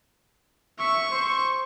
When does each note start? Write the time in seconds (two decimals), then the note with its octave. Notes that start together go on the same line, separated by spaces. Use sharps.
0.79 E5 C#6
1.11 C5